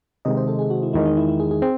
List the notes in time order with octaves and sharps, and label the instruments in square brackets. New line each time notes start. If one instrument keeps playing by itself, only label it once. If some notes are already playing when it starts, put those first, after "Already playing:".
[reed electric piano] C3 D#3 G#3 [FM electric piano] D#5
[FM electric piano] C5
A4
G#4
F#4
E4
[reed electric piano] E2 D#3 G#3 [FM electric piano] E4
[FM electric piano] D#4
E4
E4
G#4
G#4
[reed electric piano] C4 [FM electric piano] G#4